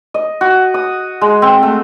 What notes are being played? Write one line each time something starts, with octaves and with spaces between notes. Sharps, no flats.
D#5
F#4
D#6
G#3
C4
A3